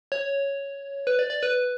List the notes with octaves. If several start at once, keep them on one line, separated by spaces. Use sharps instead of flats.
C#5
B4
D5
D5
B4